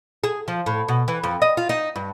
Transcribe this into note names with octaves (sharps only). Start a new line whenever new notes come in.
G#4
F3
A2
B2
E3
F2
D#5
F4
D#4
G2